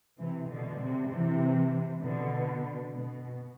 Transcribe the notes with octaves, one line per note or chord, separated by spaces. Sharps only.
C3 E3
B2 D3
C3
C3 E3
B2 D3
B2